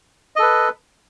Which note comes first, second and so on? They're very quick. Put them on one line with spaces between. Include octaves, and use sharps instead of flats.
D#5 A4 B4